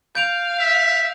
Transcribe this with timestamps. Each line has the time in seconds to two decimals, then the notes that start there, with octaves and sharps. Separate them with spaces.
0.15 F5 G6 D7 F7
0.59 E5